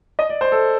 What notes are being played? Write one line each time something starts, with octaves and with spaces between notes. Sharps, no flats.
D#5
D5
C5
A4